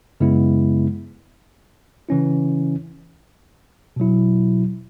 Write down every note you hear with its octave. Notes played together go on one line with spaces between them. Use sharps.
F#2 C#3 G#3 B3 E4
C#3 E3 C#4 E4
B2 F#3 E4